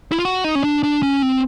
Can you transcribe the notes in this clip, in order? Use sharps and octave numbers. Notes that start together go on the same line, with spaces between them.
E4
F4
F#4
D#4
C#4
D4
D4
C#4
C4